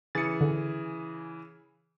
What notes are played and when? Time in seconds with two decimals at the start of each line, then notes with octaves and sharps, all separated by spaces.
0.15 C#3 E3 G#4 A6 C#7
0.41 D3